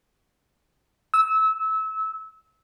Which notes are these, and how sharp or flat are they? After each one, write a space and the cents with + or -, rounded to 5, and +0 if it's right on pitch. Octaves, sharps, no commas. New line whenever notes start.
E6 -25